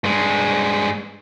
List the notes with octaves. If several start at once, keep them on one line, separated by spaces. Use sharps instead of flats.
G2 G#3